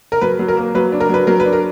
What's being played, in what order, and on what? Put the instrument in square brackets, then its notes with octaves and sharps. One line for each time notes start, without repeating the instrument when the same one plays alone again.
[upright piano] A#4
F#3 B4
F#3
A#4
A#3
F#3 B4
D4
A#4
F#3 B4
F#3 A#4
B4
D4
A#4